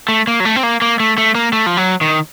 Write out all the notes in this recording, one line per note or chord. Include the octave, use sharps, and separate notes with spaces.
A3
A#3
F#3
A3
C4
A#3
A#3
A3
A3
A#3
A3
F3
F#3
D#3